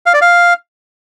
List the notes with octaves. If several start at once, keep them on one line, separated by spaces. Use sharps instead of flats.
F5
D5
F5